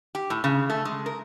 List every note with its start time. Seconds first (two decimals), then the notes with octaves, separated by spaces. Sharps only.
0.15 G4
0.30 A2
0.44 C#3
0.70 A3
0.85 G#3
1.06 A#4